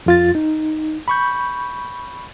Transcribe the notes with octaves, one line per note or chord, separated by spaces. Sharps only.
F2 F4 A6
D#4
B5 C#6 G6